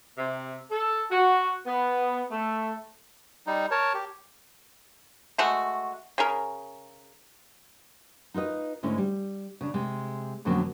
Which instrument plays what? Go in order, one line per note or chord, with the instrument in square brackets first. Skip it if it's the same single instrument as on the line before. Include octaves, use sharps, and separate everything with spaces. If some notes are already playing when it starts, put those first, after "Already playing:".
[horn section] C3
A4
F#4
B3
A3
[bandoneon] G3 D#4
A#4 C#5 A5
G4
[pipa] G#3 A3 F#4
C#3 G#4 A#4
[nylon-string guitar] D#4 F4 B4 D#5
G#2 D3 G#3 A3 C#4 E4
G3
C#3 D4
C3 G#3
F2 B2 D3 F#3 A#3 C#4